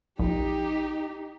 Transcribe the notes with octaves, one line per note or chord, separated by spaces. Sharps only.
A#1 D#4 G4